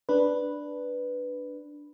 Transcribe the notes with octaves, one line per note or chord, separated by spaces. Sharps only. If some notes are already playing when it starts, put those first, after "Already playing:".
D4 B4